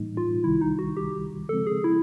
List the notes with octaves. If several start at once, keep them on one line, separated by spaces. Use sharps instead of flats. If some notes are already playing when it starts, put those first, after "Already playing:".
Already playing: A2 E3 G3 A#3 D#4
F4
C2 C3 D#3 G3 E4
D#4
F#4
G4
C#3 F3 G#3 C4 A4
G#4
E4